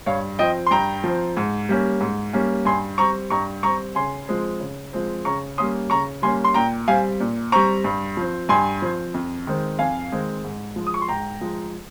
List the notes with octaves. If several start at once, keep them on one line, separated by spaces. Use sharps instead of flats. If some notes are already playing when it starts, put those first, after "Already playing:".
G2 C#5 F5
F3 C4 D#5 G5
C6
G2 G5 A#5
F3 C4
G#2
G3 A#3 C#4
G#2
G3 A#3 C#4
G2 G#5 C6
G3 C4 A#5 C#6
G2 A#5 C#6
G3 C4 A#5 C#6
C#3 G#5 C6
F3 G#3 C4
C#3
F3 G#3 C4
C#3 A#5 C#6
G3 A#3 C#4 C6 D#6
C#3 A#5 C#6
G3 A#3 C#4 G#5 C6
C6
A#2 G5 A#5
G3 C4 F5 G#5
A#2
G3 C4 A#5 C#6
G2
F3 C4
G2 G#5 C6
F3 C4
F2
D#3 G#3 C4
F2 F5 G#5
D#3 G#3 C4
G#2
F3 G#3
D#6
C#6
C6
G#2 G5 A#5
F3 G#3